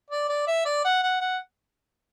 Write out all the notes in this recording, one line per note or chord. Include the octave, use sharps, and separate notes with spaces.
D5
D5
E5
D5
F#5
F#5
F#5